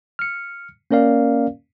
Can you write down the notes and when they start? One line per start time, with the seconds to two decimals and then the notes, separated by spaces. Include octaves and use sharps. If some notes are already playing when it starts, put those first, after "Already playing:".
0.19 F6 C#7
0.91 A#3 C#4 A#4 D5 F5